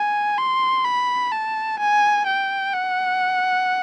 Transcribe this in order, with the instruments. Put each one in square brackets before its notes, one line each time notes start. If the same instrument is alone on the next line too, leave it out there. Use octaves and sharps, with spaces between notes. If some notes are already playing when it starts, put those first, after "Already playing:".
Already playing: [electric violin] G#5
C6
B5
A5
G#5
G5
F#5